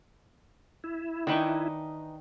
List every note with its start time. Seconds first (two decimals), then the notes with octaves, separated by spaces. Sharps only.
0.84 E4
1.27 D#3 E3 D4 D#4 B4 C#6